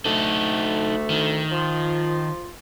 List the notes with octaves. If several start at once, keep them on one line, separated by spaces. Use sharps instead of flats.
D2 D3 A3 D#4 A4
D#3
F3 F4